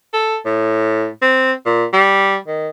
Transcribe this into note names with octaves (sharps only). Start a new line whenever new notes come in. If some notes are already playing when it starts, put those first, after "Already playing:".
A4
A2
C4
A#2
G3
D#3